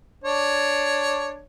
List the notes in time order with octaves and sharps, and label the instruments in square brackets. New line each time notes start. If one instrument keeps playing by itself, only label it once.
[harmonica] D4 C#5